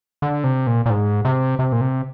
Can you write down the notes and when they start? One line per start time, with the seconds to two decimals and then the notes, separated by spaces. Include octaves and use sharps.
0.22 D3
0.44 C3
0.67 A#2
0.86 A#2
0.90 G#2
1.25 C3
1.59 C3
1.72 A#2
1.81 C3